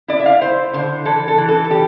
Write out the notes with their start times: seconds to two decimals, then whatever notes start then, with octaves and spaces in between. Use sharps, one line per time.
0.08 E4 D5
0.20 E5
0.26 F5
0.41 E4 C5
0.73 D3 C5
1.05 E3 A4
1.28 A4
1.38 E3
1.48 A4
1.65 A4
1.71 G3 G4